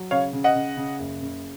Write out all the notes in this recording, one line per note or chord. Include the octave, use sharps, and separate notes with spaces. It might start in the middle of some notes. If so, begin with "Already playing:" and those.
Already playing: F#3
C#3 C#5 F5
C#3
D#5 F#5
C#3
C#3
F#1
C#3